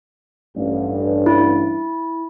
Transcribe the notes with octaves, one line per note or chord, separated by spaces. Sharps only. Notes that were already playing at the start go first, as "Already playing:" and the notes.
A1 G2
E4